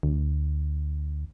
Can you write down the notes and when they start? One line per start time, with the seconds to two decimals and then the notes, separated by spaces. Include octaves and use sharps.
0.03 D2